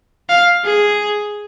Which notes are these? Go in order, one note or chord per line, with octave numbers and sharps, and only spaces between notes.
F5
G#4